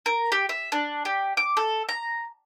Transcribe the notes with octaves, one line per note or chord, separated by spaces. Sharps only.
A#4
G4
E5
D4
G4
D6
A4
A#5